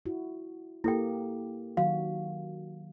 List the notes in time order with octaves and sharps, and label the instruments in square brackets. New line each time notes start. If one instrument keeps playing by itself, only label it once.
[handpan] E4 F#4
[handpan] A#3 G4 [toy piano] E4 A4 G5
[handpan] D#3 F#3 F#4 [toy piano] F5